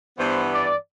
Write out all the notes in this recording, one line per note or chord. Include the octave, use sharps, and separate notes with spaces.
G2 E3 B3 C5
D5